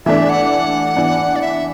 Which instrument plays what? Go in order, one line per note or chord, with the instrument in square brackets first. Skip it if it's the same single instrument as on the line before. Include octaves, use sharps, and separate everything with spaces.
[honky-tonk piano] E3 A3 D4 [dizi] E5
[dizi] F#5
[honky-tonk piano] E3 B3 D4
[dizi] D5
E5